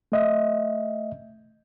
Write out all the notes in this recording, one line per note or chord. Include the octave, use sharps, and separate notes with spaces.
A3 D#5 E5